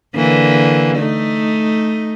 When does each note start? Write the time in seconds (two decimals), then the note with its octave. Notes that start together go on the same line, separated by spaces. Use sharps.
0.15 D3 E3 A#3
0.98 A3 D#4